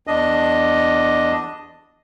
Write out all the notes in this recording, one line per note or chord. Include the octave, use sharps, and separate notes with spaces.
E2 D4 D#5